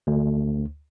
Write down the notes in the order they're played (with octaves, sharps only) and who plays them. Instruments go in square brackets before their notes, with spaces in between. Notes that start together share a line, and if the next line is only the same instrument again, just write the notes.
[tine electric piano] D2